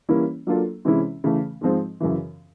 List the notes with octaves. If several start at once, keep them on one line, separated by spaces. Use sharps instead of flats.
E3 G3 A#3 C#4 E4
F#3 A#3 D4 F4 A4
C3 E3 G#3 C#4 E4
C#3 E3 A3
G#2 F3 G#3 C4 F4
F#2 C#3 E3